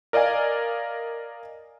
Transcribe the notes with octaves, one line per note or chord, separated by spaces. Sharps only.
A#4 D5 D#5 F5 G#5